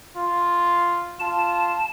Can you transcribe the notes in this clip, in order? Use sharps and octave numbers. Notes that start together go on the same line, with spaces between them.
F4
F4 A5